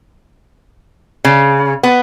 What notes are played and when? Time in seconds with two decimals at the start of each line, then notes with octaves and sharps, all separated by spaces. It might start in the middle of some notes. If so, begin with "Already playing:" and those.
1.25 C#3
1.83 B3